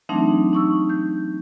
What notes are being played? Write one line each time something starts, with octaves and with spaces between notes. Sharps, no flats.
E3 F#3 A3 C4 D4 D#4
D#4 C#6 E6
G6